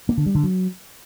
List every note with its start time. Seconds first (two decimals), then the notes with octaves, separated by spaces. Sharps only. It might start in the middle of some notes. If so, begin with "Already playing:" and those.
0.09 A#3
0.18 D3
0.26 G3
0.35 D3
0.43 F#3